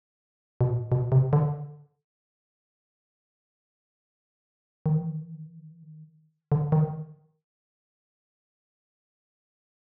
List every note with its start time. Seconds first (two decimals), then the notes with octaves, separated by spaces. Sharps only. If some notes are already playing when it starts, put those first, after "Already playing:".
0.61 B2
0.70 A#2
0.92 B2
1.12 C3
1.33 D3
4.86 D#3
4.97 E3
5.10 D#3
5.22 E3
5.35 D#3
5.47 E3
5.59 D#3
5.71 E3
5.83 D#3
6.52 D3
6.72 D#3